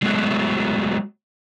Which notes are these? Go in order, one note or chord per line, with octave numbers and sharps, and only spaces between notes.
F#3 G#3 A3 B3 F#4